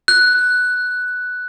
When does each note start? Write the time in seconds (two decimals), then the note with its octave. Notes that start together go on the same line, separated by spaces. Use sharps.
0.08 F#6